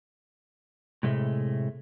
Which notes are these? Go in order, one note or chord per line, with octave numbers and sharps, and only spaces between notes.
A2 C3 G#3 A3